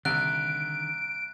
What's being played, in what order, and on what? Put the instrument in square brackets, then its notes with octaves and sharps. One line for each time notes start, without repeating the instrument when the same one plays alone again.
[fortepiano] C2 [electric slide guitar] D3 D#3 [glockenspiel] F#6 [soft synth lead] D7